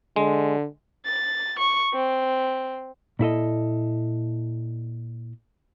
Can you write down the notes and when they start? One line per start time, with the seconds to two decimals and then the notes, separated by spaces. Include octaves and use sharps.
0.16 D3 G#3
1.04 A6
1.58 C#6
1.94 C4
3.19 A#2 E4 A4 D#5